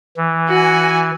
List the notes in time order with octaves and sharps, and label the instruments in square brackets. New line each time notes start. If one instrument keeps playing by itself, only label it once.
[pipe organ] E3
[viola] F#4 G#5